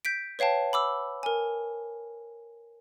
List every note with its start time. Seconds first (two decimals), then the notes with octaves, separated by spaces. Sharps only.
0.05 G6 B6 D7
0.39 B4 C#5 F5 G5 A5
0.73 B5 D6 E6
1.23 A#4 G#5